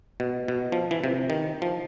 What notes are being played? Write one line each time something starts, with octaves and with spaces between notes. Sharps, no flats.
B2
B2
F3
E3
C3
D#3
F3